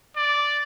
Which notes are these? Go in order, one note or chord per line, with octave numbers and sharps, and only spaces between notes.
D5